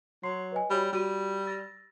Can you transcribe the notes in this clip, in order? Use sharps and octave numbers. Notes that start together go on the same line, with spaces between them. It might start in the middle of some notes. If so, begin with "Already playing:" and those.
F#3 C6 C7
B4 D#5 G#5
G3 F#4 C#5 B5
G3 F#4 D#7
E6 A6 A#6